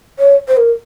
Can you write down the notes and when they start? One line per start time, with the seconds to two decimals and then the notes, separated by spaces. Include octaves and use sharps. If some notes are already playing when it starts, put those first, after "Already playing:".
0.19 C#5
0.48 C5
0.57 A#4